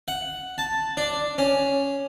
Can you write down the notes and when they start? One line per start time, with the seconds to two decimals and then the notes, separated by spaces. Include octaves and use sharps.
0.08 F#5
0.58 A5
0.97 D4
1.38 C#4